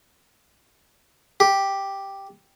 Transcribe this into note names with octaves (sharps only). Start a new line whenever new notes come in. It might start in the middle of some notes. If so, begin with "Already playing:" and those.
G4